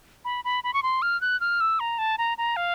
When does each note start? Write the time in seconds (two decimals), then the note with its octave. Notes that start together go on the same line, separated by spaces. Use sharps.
0.25 B5
0.45 B5
0.64 B5
0.74 C#6
0.83 C6
1.02 F6
1.21 F#6
1.41 F6
1.61 E6
1.80 A#5
1.98 A5
2.18 A#5
2.38 A#5
2.56 F5